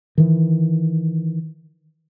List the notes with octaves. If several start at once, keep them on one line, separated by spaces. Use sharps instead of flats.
D#3 E3